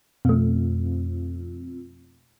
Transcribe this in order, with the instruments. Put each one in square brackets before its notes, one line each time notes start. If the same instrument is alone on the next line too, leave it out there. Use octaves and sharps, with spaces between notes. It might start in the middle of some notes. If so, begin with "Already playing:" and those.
[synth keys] F2 [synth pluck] B2 A3